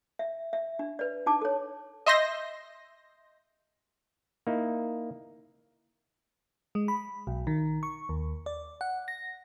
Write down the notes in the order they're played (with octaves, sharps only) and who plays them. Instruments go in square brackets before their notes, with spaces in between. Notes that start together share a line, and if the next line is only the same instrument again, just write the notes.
[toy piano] E5
E5
D4
B4 D5
D4 D#4 A5 D6
A4 C#5
[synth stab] D#5 E5 C6 G6 A#6
[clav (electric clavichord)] A#3 D#4 E4
[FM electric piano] G#3
B5
B1
D#3
C#6
D#2
D5
F#5
A#6